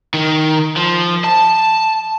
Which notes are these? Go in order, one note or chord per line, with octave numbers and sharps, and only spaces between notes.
D#3
F3
A5